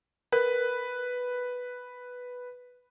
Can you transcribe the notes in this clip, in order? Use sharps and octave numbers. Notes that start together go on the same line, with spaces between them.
A#4 B4